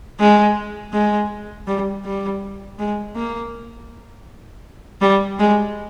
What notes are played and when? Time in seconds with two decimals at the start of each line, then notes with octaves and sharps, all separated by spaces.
0.19 G#3
0.93 G#3
1.67 G3
2.05 G3
2.79 G#3
3.16 A#3
5.01 G3
5.39 G#3